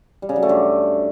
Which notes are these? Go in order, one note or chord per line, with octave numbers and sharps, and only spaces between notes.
G3
C#3
F#3
A3
G2